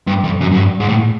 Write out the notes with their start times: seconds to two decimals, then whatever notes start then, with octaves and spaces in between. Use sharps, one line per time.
0.07 G2
0.24 F2
0.41 F#2
0.51 F#2
0.56 G2
0.80 G#2
0.89 A2